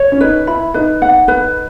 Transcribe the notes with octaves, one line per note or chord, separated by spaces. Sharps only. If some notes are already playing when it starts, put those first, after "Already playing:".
Already playing: C#5
C#4
D#4 B4
E4 B5
D#4 B4
F#5
B4